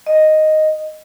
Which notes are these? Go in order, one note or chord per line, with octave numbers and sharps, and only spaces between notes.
D#5